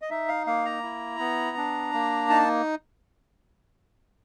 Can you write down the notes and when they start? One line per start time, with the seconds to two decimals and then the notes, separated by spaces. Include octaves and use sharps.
0.02 D#5
0.10 D#4 E5
0.28 F5
0.47 A#3 F5
0.65 A#5
0.83 E4
1.19 B3
1.57 D4
1.93 A#3
2.29 D#4 A5